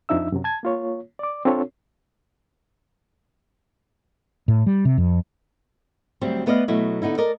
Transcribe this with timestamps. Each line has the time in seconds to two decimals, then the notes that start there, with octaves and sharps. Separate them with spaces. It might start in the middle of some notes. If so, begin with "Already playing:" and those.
0.09 F2 F3 D4 D#4 E5 E6
0.32 F#2 C3 F#3
0.44 A5 G#6
0.63 A#3 F4 C#5
1.19 D5 D6
1.45 C4 D4 F4 A4 C#5
4.48 A2
4.66 G3
4.85 C3
4.98 F2
6.21 D2 F#3 G3 C4 C5
6.46 A3 B3 B4 D5 D#5 F5
6.68 B2 F#3 A3 E4 D#5
7.02 D3 B3 D#4 E4
7.18 A4 A#4 D5 D#5